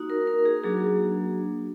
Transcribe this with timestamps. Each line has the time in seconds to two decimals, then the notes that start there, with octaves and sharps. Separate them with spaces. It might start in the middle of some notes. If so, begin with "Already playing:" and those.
Already playing: A#3 D#4 F#4
0.10 A#4
0.27 A#4
0.46 G#4
0.64 F#3 A#3 D4 F#4 G#4